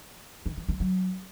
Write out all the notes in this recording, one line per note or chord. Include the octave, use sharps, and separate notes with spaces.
D#3
E3
G#3
F#3